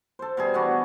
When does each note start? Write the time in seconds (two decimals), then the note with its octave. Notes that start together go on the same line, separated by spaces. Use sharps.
0.19 A4 C5
0.37 B2 G3 G#4
0.54 E3 B3 D4 F#4